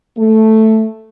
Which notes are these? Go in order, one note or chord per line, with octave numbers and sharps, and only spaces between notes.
A3